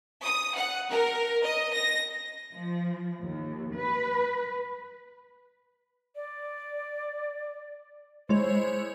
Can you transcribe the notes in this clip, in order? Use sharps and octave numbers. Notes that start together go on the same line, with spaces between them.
D#6
F#5
A#4
D#5
A#6
F3
D#2
B4
D5
G#3 E4 C5 C#5